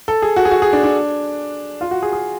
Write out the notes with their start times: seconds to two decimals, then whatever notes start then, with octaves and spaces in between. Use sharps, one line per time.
0.08 A4
0.22 G#4
0.36 F#4
0.45 G#4
0.51 F#4
0.62 G#4
0.73 D4
0.83 D4
1.81 F4
1.91 F#4
2.03 G#4
2.13 G#4